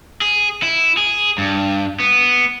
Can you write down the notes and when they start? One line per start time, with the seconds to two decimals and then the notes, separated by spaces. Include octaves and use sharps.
0.21 G#4
0.63 E4
0.97 G#4
1.38 G2
2.00 B3